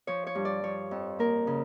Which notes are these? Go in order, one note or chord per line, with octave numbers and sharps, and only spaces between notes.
F3 C#5
C#5
G2
D5
F3 C#5
F2
A#3 A#4
C#3